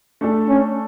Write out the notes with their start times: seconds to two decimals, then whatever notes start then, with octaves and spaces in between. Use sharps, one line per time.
0.21 A3 D4 A4
0.49 C#4